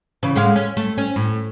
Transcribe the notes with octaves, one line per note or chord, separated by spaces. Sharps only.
C#3 E3
A2 G#3 F5
C#4
A3
C#4
A2